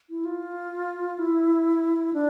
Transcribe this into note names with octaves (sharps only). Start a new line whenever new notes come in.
E4
F4
E4
D4